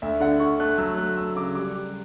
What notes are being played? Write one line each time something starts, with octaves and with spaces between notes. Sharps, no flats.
D2 E5
D3 F#5
D3 C#6
A3 F#6
F#3 E6
A3 F#6
A3 E6
C#3 D6
G3 D6
G3